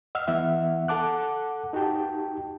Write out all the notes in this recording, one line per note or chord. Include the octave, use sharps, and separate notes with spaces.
D#5 F#5 E6 F6
E3 B3 E5 F#5
A4 F#5 A5 D6 F#6
D#4 F#4 G4 G5 A5